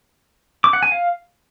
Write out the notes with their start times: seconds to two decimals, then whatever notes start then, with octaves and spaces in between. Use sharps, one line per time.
0.64 D6
0.73 F#5
0.83 G#5
0.92 F5